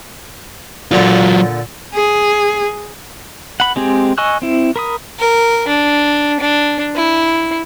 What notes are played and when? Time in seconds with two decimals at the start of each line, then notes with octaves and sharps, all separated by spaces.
0.91 A#2 D3 F#3 F4
1.94 G#4
3.60 F#5 B5
3.76 G#3 C4 G4 G#4
4.18 D#5 G#5 C#6 E6 F#6
4.42 C4 E4
4.76 A#4 B5 D#6
5.19 A#4
5.68 D4
6.40 D4
6.96 E4